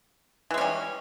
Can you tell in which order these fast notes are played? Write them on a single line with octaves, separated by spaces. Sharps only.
E3 G#3 C#4 G3